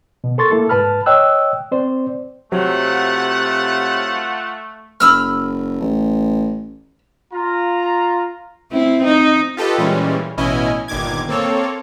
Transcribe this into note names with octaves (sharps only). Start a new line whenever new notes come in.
B2
A4 A#4 C6 C#6 A6
A#3 E4 A4
G#2 B4 A5 B5 F6
C#5 D#5 G5 E6 F#6
C4 C5 D5
C3 F#3 A3 F4 F5 F#5
F#1 B5 E6 F6
A1
F4 A#5
C4 E4
D#4
F4 G4 A4 B4 D#5
A#2 E3 G3 G#3 C#4
A1 B2 C#4 E4 D#5 G#5
G1 A#2 D#3 D6 G#6
A#3 C4 A4 C#5